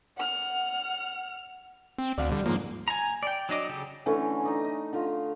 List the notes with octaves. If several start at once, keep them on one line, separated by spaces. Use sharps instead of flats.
F#5 F6
C4
D2 D5 F5 F#5
D3 G3
G#2 F3 A#3
G#5 A#5
D5 G5
F#3 D4 D#5 D6
C#3 F#3 G4 A4
D3 E3 A3 C#4
D4 D#4 D#5
D#5
D3 F4